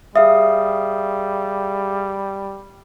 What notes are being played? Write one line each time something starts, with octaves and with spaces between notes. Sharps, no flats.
G3 G#4 E5 F5 D#6